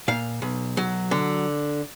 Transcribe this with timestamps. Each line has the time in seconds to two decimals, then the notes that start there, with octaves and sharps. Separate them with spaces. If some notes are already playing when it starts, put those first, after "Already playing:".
0.08 A#2 F5
0.42 B1
0.77 F#3
1.11 D3